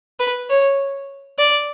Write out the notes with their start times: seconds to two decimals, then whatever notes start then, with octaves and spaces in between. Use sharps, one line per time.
0.19 B4
0.50 C#5
1.39 D5